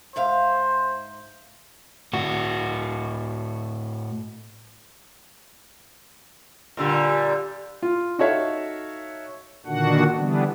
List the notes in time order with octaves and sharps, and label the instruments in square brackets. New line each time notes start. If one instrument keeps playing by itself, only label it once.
[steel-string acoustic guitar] G#2 E5 F5 [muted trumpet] C5
[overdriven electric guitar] A2 F#4
[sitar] A#2 D3 G3
[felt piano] F4
D#4 F#4 A4 C#5 E5 F5
[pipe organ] A#2 D3 D#3 D4 F#4 F#5
D3 E3 G3 B3 D4